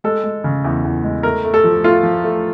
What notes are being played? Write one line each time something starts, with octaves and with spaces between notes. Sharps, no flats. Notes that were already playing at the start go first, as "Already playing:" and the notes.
G#3 A4
G#3
C#3
E2
E2
G#3
A3 A#4
A3
A4
F3
A3 F4
F3
A3